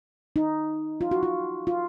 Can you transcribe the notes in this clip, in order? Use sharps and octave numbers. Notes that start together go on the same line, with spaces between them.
D#4
F4
F#4
F4
F4